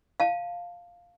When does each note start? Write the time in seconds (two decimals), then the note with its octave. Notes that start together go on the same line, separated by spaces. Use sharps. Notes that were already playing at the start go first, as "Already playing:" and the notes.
0.20 F5 A5